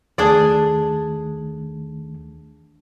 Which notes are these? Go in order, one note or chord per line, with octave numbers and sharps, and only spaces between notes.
D#2 D#3 A3 D4 G#4 D5